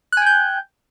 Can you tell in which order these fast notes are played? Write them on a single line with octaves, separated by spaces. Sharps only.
F#6 G#5 G5 G6